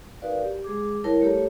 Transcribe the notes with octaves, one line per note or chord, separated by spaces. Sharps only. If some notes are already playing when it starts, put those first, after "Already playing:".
D#4 F#4 A#4 B4 D5 F5
G4
G#3 G#4 D6
G3 E4 A#4 C#5 A5
A3 G4 A4 C#5 A5 A#5